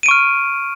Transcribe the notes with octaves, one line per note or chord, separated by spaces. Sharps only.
C#6 F6 D7 D#7